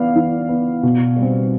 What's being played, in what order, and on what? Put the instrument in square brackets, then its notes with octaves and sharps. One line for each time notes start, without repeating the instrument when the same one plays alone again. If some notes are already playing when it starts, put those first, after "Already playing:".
Already playing: [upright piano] E3 B3 D5 F5
E3
B3
B2
G3
C4